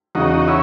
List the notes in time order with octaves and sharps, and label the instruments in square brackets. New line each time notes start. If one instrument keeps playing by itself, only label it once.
[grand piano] E2 C#3 E3 [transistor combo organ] D#4 F#4
[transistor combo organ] C#4 E4